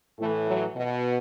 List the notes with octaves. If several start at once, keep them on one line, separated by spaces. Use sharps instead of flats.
A2 E3 A3
F#3
B2